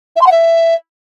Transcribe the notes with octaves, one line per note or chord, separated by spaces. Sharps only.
E5
C6
F#5
E5